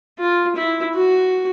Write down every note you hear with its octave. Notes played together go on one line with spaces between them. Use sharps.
F4
E4
F#4